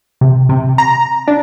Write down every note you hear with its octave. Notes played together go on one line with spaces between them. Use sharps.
C3
C3
A#5
D4